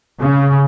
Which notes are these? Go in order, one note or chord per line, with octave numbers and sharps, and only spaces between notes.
C#3